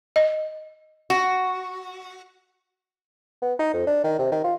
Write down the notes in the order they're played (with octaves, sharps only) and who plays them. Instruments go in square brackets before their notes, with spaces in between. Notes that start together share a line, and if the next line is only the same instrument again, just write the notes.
[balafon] D#5
[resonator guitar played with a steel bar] F#4
[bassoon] B3
D#4
F2
D4
D#3
C3
D#3
F4